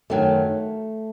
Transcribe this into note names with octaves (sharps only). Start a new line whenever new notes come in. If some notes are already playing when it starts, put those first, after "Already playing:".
F#2 D#3 F#3 A3